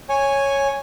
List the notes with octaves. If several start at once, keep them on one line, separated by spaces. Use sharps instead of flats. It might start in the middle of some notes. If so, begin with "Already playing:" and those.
C#5 G#5